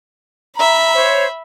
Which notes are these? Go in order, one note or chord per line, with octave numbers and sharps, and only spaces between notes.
E5 A#5 B5
C5 C#5